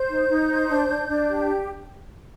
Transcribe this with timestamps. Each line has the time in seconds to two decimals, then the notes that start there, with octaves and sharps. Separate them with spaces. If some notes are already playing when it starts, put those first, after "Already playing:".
Already playing: C5 G6
0.08 D#4
0.29 D#4
0.49 C5
0.69 D4
0.89 D4
1.09 D4
1.29 G4